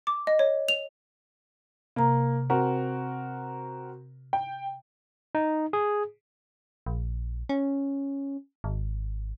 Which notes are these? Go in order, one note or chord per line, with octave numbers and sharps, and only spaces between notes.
D6
D#5
C#5
F7
C3 A#3 A#5
C4 F#4 A#4
G5
D#4
G#4
A#1
C#4
G#1